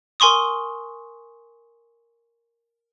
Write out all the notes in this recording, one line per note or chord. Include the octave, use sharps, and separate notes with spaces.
A#4 G#5 C6 C#6 D#6